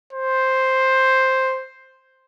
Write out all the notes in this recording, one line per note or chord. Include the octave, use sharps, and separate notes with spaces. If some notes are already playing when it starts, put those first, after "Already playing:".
C5